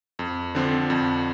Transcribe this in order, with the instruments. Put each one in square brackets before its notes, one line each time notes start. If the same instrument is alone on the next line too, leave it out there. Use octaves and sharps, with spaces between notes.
[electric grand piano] F2
D3 F3 C4
F2